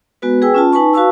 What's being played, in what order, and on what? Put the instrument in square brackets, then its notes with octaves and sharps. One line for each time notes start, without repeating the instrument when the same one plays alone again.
[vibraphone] G#3 B3 F#4 B4
G#4 B4 G5 G#5 E6
C#4 F4 A5
D#4 B4 G#5 A5 C#6
F#4 B4 F5 A5 C#6 E6